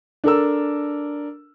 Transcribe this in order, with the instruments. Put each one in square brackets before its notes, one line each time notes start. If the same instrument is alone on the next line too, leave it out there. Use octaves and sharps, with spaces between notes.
[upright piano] D4 A4 A#4 E6